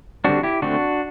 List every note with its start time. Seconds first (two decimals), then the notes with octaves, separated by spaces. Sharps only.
0.24 D3 G3 C4 D4 F#4
0.43 E4 G4
0.62 D3 A3 C4 D4 F#4